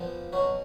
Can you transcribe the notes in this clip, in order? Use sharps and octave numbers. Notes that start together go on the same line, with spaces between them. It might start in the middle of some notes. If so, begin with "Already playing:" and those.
Already playing: A#2 F3 B3
B2 F#3 C#4 F#4